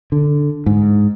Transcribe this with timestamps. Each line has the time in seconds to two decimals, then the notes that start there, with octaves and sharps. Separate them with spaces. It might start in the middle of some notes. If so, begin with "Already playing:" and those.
0.12 D3
0.66 G#2